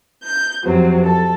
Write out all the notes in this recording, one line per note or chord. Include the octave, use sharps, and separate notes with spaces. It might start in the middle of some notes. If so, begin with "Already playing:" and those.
G6
F2 C3 F#3 C4
A4